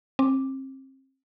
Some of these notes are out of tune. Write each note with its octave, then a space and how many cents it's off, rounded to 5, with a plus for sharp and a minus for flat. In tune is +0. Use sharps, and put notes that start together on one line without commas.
C4 +35 D6 +0